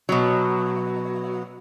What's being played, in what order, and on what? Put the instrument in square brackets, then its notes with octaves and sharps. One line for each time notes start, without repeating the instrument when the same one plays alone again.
[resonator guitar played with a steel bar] B2 F#3